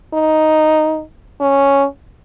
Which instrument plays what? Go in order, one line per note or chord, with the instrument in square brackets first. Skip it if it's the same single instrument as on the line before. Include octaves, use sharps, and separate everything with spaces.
[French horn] D#4
C#4